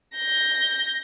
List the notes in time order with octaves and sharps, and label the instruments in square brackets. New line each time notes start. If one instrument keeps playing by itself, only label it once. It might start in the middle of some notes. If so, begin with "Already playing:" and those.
[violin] G6 A#6